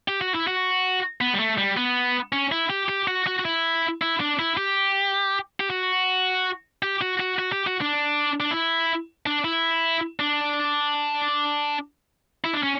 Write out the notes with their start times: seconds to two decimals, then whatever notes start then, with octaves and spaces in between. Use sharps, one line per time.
0.08 G4
0.21 F#4
0.35 E4
0.47 F#4
1.21 B3
1.34 G3
1.40 A3
1.58 G3
1.77 B3
2.33 C#4
2.52 E4
2.70 G4
2.89 G4
3.08 F#4
3.27 F#4
3.39 F#4
3.45 E4
4.02 E4
4.20 D4
4.39 E4
4.57 G4
5.60 G4
5.70 F#4
6.83 G4
7.01 F#4
7.20 F#4
7.39 F#4
7.52 G4
7.67 F#4
7.81 D4
8.40 D4
8.51 E4
9.26 D4
9.45 E4
10.20 D4
12.44 E4
12.53 D4
12.63 C#4